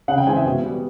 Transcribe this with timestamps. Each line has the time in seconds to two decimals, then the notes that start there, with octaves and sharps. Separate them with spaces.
0.08 C#3 F#5
0.18 G5
0.27 E3 G#3 C4 G#5
0.36 E5
0.45 B2
0.63 G3 B3